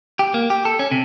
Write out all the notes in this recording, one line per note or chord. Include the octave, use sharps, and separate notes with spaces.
G4
A#3
G4
A4
C#4
C3